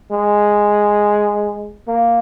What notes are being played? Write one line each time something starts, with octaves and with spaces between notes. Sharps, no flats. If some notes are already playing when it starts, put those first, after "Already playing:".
G#3
A#3